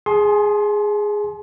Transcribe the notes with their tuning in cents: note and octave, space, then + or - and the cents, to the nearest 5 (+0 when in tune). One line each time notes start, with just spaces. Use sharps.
G#4 +0 A5 -45 C6 +15